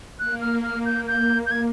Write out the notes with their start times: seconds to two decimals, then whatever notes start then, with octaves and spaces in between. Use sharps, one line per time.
0.19 A#3 F#6
0.41 F6
0.64 F6
0.85 G6
1.08 G6
1.46 G6
1.51 G#6